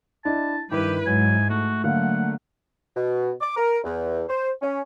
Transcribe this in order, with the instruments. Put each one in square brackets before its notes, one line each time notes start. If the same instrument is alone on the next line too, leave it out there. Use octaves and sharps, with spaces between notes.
[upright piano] D4 E4 D#5 [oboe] A5
[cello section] G2 B4 [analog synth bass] D#3 [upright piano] E4 [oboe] G4
[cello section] G#2 [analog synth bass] F#3 [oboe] G#5
[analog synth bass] A3 [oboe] F#4
[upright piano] D3 A#3 F5 [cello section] F#3 [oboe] F#5
[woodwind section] B2
D6
A#4
E2
C5
C#4